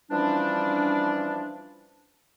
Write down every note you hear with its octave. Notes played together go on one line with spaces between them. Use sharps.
E3 F3 G3 C#4 D4